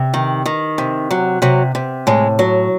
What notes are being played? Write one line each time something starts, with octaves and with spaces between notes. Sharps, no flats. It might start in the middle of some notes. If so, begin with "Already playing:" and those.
Already playing: C3
D#3
D#3
C3
F#3
C3 F#3
C3
A2 G#3
F#3